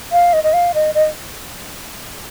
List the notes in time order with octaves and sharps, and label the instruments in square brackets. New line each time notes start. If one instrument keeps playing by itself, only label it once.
[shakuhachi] F5
D#5
D#5
F5
D#5
D#5